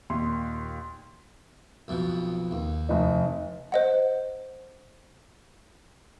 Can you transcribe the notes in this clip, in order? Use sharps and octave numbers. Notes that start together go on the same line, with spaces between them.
D#2 A#2 C6
B1 F2 B2
D#2
F1 D#4
C5 D#5 F#5